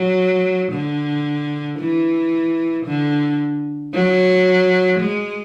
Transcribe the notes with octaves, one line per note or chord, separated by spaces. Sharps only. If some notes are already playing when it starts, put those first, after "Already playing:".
Already playing: F#3
D3
E3
D3
F#3
G#3